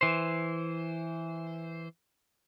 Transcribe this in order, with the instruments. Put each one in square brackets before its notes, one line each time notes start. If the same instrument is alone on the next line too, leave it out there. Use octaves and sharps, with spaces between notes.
[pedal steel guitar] E3 C5